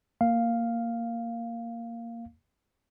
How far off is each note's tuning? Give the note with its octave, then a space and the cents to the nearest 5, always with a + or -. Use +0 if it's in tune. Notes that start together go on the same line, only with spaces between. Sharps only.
A#3 -10 F5 +0